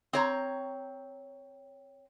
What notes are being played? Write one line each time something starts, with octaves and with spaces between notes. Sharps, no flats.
C4 C#5 A#5